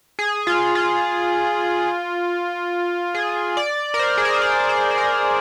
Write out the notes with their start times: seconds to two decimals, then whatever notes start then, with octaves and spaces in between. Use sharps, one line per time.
0.19 G#4
0.47 F4
0.75 F4
3.15 G#4
3.57 D5
3.94 A#4
3.99 C5
4.18 G#4
4.25 A#4
4.34 C5
4.42 D5
4.69 C5
4.91 C5
4.98 A#4